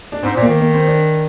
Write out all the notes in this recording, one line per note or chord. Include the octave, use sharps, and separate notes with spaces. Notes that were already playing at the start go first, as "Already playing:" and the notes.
D4
G#2 C4
A#2
A#3
D#3
A#3
C4
D4